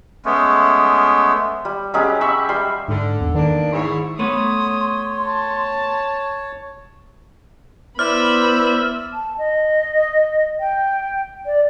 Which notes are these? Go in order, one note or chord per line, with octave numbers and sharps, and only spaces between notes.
G#3 A3 B3 C#4
G3
F#3 G#3 C#4 G4
E5 B5 C#6
G3 C6
G#2 D3
E2
D#3 A#3 B3 D4
G#2 E4 C#5
A3 B3 B4 C#5 C6 D#6
A5
B3 E4 C5 D5 B5 E6 F6
A5
D#5
G5
D5